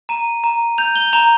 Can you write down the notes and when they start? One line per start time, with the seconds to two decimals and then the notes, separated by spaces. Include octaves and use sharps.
0.09 A#5 D#7
0.44 A#5
0.78 G6 F7
0.96 G7
1.13 A#5 F7